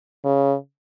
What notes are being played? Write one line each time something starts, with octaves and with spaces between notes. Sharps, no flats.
C#3